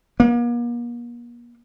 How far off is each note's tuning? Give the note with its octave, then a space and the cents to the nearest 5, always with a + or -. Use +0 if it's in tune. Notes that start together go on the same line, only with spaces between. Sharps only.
A#3 +40